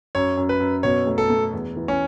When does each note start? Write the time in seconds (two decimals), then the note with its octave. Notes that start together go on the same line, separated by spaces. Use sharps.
0.15 F#2 C#5
0.37 F#2
0.49 B4
0.60 F#2
0.83 B2 C#5
1.06 A3
1.18 A4
1.30 A3
1.53 E2
1.76 E3
1.88 C#4